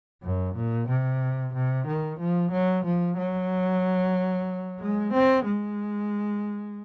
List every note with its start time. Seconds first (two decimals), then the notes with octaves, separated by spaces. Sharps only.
0.23 F#2
0.56 A#2
0.88 C3
1.54 C3
1.87 D#3
2.19 F3
2.51 F#3
2.85 F3
3.17 F#3
4.80 G#3
5.13 C4
5.45 G#3